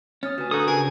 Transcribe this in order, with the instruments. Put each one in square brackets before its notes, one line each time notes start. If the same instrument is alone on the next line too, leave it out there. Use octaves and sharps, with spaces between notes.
[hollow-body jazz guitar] C#4 [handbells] D#6 F6 A6
[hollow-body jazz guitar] D2 [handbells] F#4 B4 G#5
[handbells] D4 A#5 G6 [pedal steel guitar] F#4 D#6 [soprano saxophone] A4
[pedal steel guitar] C#3 [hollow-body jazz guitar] A#4 [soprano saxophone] G#5